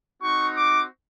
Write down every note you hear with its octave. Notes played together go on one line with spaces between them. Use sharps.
C4 D#4 F#4 C#6
D6